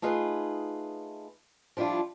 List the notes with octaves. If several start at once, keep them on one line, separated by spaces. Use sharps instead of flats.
A3 D#4 F4 G#4 B4
F3 G3 D4 E4 F4